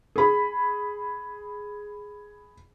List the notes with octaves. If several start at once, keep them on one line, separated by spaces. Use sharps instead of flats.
G#4 B5